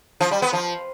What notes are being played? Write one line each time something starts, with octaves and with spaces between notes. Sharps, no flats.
F3
G3
B3
F3